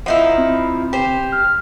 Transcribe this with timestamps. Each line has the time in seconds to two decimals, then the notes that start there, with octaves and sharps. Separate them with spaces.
0.06 F3 D#4 E4 F#5
0.38 C4
0.93 G4 C5
1.32 F6